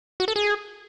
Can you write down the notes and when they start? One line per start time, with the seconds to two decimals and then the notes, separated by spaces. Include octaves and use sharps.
0.20 F#4
0.28 A4
0.36 G#4